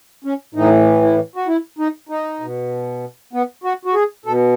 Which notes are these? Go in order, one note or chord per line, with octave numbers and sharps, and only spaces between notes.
C#4
A2 E3 D#4
E4
F#4
E4
D#4
D#4
B2
B3
F#4
F#4
G#4
B2 A4